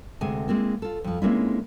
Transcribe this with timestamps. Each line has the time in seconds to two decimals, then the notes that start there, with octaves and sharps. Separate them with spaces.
0.21 D2 C3 G#3 G#4 G#5
0.48 G#3 A#3 C4 E4
0.82 F4 A4
1.04 F2 F3
1.22 G#3 A#3 C4 C#4 D#4 E4